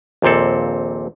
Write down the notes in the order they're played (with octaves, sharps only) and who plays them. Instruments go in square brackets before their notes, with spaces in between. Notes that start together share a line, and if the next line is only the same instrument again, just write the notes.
[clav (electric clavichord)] A#1 D#2 A#2 C4 A4